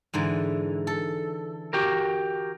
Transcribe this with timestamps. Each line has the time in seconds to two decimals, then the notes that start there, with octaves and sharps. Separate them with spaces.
0.14 G#2 D3 E3
0.87 A4
1.73 F#4 G4 A#4